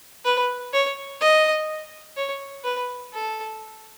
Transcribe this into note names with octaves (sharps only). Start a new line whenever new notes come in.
B4
C#5
D#5
C#5
B4
A4